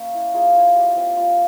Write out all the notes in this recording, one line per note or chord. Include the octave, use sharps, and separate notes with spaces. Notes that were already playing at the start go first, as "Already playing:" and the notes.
Already playing: A#3 C#4 C#5 E5
E4
A#3 F4 G#4
E4
G3 G4
C4 F4
G3 F4